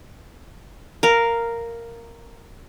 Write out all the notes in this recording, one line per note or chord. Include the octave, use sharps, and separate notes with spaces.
A#4 F5